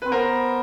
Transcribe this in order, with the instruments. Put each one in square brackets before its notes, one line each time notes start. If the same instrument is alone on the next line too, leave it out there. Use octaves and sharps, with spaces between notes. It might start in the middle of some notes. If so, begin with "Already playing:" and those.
[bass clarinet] C4 [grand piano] B4
[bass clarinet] B3 [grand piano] A#4 C5